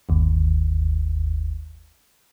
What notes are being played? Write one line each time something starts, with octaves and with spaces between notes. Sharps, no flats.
G1 D#2